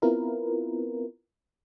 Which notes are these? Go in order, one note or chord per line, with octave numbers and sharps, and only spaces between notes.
B3 C4 E4 F4 A#4 B4